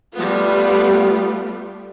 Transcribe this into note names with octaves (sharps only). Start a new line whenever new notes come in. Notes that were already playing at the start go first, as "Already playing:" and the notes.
G3 A3 B3 F4